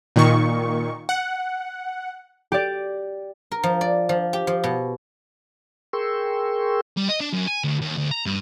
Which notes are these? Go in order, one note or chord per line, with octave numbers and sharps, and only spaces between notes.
A#2 D#3 C#6
F#5
G4 D5
A#4
F3
D5
F3
G4
F3
B2
G#4 A#4 G5 C6 C#6 E6
G3
D#5
D4
F#2
G#5
D2
D#2
D2
A#5
G2